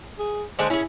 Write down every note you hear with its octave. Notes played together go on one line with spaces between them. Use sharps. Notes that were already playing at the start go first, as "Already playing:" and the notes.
G#4
D3 G#3 G#4 C5
C#4 E4 G#4